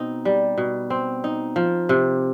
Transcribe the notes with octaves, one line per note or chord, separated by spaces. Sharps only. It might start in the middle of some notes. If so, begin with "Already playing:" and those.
Already playing: B2 C4 D#4
G3
B2
C4
D#4
F3
C3